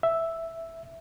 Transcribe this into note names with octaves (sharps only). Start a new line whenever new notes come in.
E5